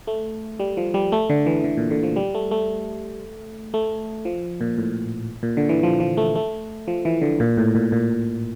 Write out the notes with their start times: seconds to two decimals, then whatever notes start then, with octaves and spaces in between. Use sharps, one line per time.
0.07 A3
0.60 G3
0.77 F3
0.94 G3
1.12 A3
1.30 D3
1.46 E3
1.64 D3
1.77 A#2
1.91 D3
2.03 F3
2.16 G3
2.35 A3
2.51 A3
3.74 A3
4.25 F3
4.61 A#2
4.78 A2
5.43 A#2
5.57 D3
5.69 E3
5.83 F3
6.00 F3
6.17 A3
6.36 A3
6.88 F3
7.05 E3
7.22 D3
7.40 A#2
7.58 A2
7.75 A#2
7.92 A#2